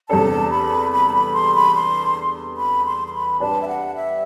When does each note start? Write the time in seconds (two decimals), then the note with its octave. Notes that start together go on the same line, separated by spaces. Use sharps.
0.09 E2 C3 G3 D4 A4 A5
0.51 B5
0.92 B5
1.09 A5
1.13 B5
1.33 C6
1.55 B5
1.75 C6
2.57 B5
2.86 C6
3.08 C6
3.13 B5
3.40 G3 D4 G4 B4 A5
3.62 E5
3.68 F#5
3.95 E5